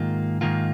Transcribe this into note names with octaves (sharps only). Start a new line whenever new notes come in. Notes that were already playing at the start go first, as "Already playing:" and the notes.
Already playing: G#2 D#3 A#3 F4
G#2 D#3 A#3 F4